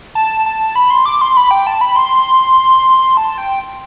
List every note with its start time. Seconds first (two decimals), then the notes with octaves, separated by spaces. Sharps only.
0.15 A5
0.46 A5
0.76 B5
0.90 C6
1.06 D6
1.21 C6
1.37 B5
1.51 G5
1.67 A5
1.81 B5
1.96 C6
3.17 A5
3.38 G5